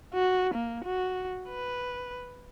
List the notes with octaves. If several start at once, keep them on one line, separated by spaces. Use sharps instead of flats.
F#4
A#3
F#4
B4